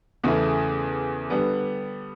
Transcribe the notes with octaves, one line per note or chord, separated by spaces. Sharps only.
E2 C#3 E3 A3
D3 G3 B3